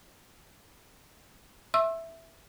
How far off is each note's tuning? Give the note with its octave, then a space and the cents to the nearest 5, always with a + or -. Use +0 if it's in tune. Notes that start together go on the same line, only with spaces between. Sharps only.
E5 +0 C6 +45 E6 +10